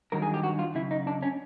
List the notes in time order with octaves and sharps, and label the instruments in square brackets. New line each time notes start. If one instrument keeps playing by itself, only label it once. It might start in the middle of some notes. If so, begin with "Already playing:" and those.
[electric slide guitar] G2 D#3 F#3 A#4
G#4
G4
F#4
F4
F#2 C#3 E4
D#4
D4
C#4